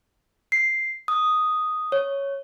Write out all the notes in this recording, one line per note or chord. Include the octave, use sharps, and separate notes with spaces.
C7
D#6
C#5